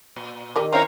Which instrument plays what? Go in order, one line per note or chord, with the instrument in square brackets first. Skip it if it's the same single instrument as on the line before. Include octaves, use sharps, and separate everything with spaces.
[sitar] A#2
[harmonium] D#3 [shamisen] G4 A#4 D5
[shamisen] C4 E4 [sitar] C#4 C5 C#5 [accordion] F5 A#5